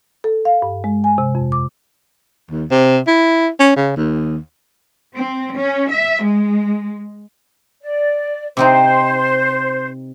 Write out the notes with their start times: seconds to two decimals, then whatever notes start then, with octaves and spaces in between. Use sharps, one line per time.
0.24 A4
0.45 F5
0.62 G2
0.84 G#3
1.04 G#5
1.18 C3
1.35 F2
1.52 D6
2.50 D#2
2.71 C3
3.07 E4
3.60 C#4
3.76 C#3
3.96 D#2
5.16 C4
5.56 C#4
5.91 E5
6.24 G#3
7.81 D5
8.57 C3 C4 D#4 C5